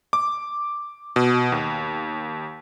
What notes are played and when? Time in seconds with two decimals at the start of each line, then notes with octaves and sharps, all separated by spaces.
0.13 D6
1.16 B2
1.52 D#2